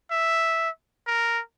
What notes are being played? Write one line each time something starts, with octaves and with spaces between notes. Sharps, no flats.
E5
A#4